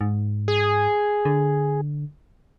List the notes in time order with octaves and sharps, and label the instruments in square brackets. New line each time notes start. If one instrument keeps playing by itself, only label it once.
[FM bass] G#2
[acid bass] G#4
[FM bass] D3